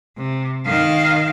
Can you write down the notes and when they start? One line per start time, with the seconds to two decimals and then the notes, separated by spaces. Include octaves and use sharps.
0.17 C3
0.65 D#3 F5